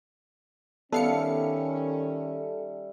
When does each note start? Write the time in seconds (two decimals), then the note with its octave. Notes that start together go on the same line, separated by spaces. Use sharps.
0.92 D#3 G3 B3 C#4 A4 E5 F5 C#7